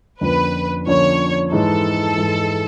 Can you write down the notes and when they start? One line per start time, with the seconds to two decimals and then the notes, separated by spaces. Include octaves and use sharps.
0.21 F2 D3 F3 A#3 C#4 B4
0.87 F2 D3 F3 A#3 C#4 C#5
1.52 G#2 E3 G#3 A4
2.17 G#2 E3 G#3